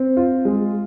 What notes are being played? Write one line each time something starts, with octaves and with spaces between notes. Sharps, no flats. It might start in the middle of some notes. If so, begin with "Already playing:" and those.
Already playing: C4
F4
G#3